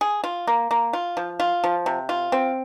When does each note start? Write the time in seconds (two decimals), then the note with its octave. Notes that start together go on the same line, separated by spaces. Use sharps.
0.01 G#4
0.24 F4
0.47 A#3
0.71 A#3
0.93 F4
1.17 F3
1.40 F4
1.64 F3
1.86 C3
2.09 F4
2.32 C4